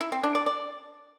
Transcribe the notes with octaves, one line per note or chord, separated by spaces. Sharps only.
E4
C4
D4
D5
D5